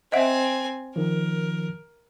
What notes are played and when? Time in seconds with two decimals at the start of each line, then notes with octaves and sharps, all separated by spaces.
0.12 C4 D#5 E5 F#5 G#5
0.96 D#3 F3 A#4